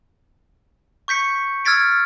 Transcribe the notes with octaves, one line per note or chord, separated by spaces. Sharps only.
C#6 G6 B6 C#7
E6 F6 G#6 A6 B6 D7